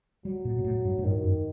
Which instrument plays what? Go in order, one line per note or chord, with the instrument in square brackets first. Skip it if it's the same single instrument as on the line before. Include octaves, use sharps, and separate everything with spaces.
[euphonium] F#3 [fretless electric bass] G3
[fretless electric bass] A#2
A#2
A2
G2
A2
[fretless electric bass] G2 [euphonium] D#3
[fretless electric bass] F#2